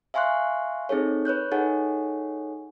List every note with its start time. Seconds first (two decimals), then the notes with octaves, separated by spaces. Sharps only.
0.14 E5 F5 G#5 C6 C#6 F#6
0.89 C4 D#4 G#4 A4 C#5
1.25 B4 C#5 F#6 G6
1.51 D#4 G#4 A4 C#5 F#5 G#5